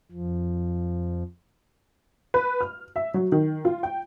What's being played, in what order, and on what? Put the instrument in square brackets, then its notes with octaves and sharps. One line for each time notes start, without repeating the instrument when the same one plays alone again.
[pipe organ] F2 F3
[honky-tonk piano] B4
F6
E5
F#3
D#3
F4
G5